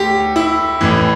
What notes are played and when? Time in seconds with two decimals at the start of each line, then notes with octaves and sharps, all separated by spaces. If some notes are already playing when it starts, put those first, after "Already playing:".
Already playing: D2 G4
0.36 E4
0.81 A1 A2 E3